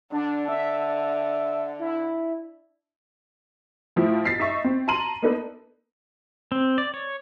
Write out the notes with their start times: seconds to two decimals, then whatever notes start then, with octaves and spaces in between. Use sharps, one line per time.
0.12 D3 D4
0.48 E5
1.79 E4
3.96 A2 F3 E4
4.25 A6 B6 C7
4.40 D#4 E5 C#6
4.65 C4
4.88 A5 A#5 C6 D#7 F#7
5.22 A#3 B3 D4 D#4 A4 B4
6.52 C4
6.78 D5
6.94 C#5